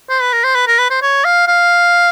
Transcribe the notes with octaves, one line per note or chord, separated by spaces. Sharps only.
C5
B4
A#4
C5
B4
A#4
B4
C5
C#5
F5
F5